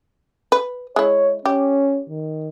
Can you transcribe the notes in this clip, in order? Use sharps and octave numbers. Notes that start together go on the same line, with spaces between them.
B4
G#3 E4 C#5
C#4 G4
D#3